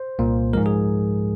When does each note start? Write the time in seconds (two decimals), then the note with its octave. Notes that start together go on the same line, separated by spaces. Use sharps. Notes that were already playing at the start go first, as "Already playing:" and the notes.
Already playing: C5
0.19 C2 A#2 A#3
0.53 G#2 F3 G#3 A#4
0.66 G#4